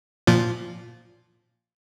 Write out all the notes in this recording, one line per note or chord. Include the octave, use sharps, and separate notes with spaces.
A#2 F3 F4